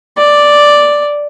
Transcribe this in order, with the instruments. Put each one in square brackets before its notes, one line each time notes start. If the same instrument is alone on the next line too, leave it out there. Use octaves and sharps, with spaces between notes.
[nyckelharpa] D5